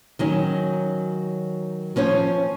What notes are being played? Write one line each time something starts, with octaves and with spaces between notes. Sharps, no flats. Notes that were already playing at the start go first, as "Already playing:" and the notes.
D#3 F#3 C#4
F3 C#4 C5 C#5